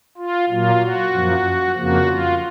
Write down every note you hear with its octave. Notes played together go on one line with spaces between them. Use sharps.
F4
A#2 F#3 A#3 F4
F#4
F#2 F3 A#3
F2 C#3 F3 A#3 F#4
F4